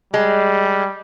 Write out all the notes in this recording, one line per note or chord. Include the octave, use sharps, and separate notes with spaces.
G3 G#3